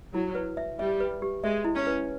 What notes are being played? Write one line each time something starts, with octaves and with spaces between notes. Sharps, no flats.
F#3 E4
B4
E5
G3 E5
B4
G4
G#3 E5
E4
C#4
B4